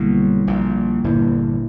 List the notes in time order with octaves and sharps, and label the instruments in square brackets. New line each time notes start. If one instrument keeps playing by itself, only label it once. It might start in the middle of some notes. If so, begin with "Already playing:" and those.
Already playing: [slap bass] B1 B2 [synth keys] D3 G3 A#3 E4
[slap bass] A#1 A#2
[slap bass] G1 G2 [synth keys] A#2 A#3 E4